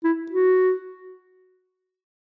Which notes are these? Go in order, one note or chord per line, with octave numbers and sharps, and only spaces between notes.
E4
F#4